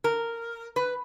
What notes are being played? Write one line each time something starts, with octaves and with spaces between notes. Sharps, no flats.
A#4
B4